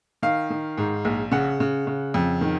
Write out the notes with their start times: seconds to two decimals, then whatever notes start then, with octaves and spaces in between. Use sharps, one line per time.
0.23 D#3 F5
0.50 D#3
0.78 G#2
1.05 A#1
1.31 C#3 F#5
1.60 C#3
1.87 C#3
2.14 F2
2.41 D#3